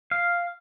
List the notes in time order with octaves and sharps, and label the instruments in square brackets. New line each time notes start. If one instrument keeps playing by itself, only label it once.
[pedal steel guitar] F5